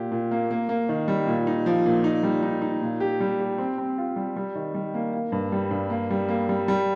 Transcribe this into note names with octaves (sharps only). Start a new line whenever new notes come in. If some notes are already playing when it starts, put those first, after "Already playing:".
Already playing: A#2 G4
A#2
A#3
A#3
A#3
D#3
G3
A#2
D#4
F3
A#2
D#4
G3
D#4
D#4
A#2
G4
G3
G4
C4
C4
F4
G3
G3
D#3
G3
A#3
A#3
G2
G3
G2
A#3
G3
A#3
G3
G3